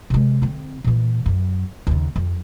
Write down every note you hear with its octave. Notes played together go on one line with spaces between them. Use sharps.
C3 G#3
D3 C4
A#2 E3
F#2 F#3
D#2 C#3
F2